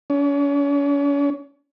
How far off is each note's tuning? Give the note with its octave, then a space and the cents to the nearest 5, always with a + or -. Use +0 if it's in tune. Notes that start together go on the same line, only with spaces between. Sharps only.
C#4 +40